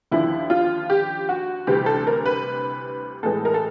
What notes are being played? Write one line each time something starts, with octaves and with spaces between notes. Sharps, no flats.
D#2 D3 F3 E4
F4
G4
F#4
D2 C3 E3 G3 G4
A4
A#4
B4
A2 E3 G#3 A4
A#4
A4